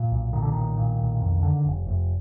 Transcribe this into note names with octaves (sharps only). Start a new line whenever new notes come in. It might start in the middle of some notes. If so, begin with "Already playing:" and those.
Already playing: A#2
B1
A#2 D#3
D3
B1 D#3
A#2
B1
F2
D3
F1
F1